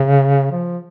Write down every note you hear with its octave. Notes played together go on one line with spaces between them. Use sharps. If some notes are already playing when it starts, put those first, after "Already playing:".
Already playing: C#3
F3